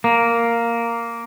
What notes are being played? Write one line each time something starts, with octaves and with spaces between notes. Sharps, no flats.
A#3